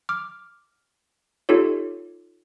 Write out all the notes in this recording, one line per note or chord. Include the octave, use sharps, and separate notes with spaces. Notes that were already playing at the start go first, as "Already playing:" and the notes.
D6 F6
D#4 F4 G4 A4 C#5